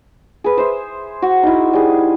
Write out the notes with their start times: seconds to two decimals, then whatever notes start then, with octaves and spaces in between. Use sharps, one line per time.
0.44 G#4 B4
0.58 C5 E5
1.22 F#4
1.43 D#4 E4
1.73 G3 G#4